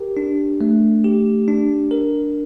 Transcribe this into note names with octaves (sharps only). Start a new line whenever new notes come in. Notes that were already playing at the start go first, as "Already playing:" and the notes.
Already playing: G4 A#4
D4
A3
G4
D4
A#4